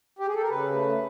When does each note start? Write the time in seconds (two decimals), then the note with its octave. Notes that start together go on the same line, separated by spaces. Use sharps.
0.19 G4
0.26 G#4
0.34 A4
0.42 A#4
0.49 C#3 B4
0.73 A3